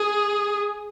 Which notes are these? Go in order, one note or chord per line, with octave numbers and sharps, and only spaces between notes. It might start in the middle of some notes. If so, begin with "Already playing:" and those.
Already playing: G#4